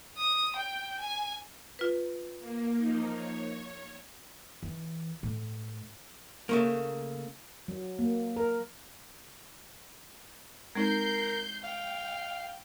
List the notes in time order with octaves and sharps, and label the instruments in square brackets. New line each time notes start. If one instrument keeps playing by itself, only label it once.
[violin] D#6
G5
G#5
[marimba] F4 B4
[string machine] A#3
F3 A#3 D#4
C#5
[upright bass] E3
A2
[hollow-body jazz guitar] C#3 A3 A#3
[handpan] F#3
A#3
A#4
[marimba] G#3 C4 D#4 [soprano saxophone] A#4 [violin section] G6 C7
[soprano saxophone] F5 [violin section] G5